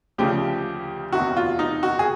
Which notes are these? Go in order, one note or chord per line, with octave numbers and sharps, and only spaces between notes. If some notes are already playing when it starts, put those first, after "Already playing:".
D2 C#3 F3 G4
E2 C3 D#3 F#4
F4
D#4
F#4
G#4